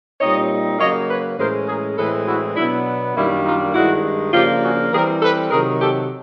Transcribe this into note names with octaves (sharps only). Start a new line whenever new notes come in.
A#2 G3 C4 D#4 C#5 D#5
C#3 F#3 A#3 C#5 D#5
B4 C#5
A2 E3 G#3 C#4 A#4 C5
G#4 A#4
A2 E3 G#3 C4 A4 B4
E4 F#4
B2 F#3 B3 D4 E4
F#2 D#3 G3 A#3 D4 E4
D#4 F4
G2 D#3 G#3 E4 F#4
C#3 F3 A#3 D4 F4 G4
F#4 G#4
E3 G3 C4 G#4 A#4
A4 B4
C3 D#3 F#3 G#4 A#4
G4 A4